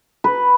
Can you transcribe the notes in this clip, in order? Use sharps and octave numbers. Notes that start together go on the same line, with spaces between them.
B4